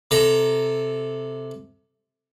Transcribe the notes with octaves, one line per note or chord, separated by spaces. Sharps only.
C3 A4 A#5